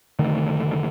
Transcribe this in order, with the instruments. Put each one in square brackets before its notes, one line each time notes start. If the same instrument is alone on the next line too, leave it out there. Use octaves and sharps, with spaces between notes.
[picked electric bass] F1 D3 D#3 A3